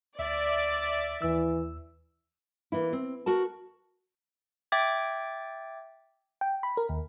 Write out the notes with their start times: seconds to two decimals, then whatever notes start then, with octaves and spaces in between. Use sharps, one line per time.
0.19 D2 D5 E5
1.22 D#2 E3 E6
2.72 E3 A#3 E4
2.93 C4
3.26 F#4 A#4 A5
4.72 E5 G5 D6 G#6 A6
6.41 G5
6.63 B5
6.77 A#4
6.89 D#2